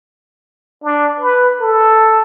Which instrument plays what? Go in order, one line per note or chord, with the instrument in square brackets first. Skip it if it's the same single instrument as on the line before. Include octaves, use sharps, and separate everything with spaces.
[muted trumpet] D4
B4
A4